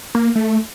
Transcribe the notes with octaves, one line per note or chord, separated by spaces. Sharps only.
A#3
A3